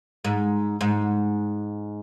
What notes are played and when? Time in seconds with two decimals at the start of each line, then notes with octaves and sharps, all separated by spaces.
0.24 G#2
0.81 G#2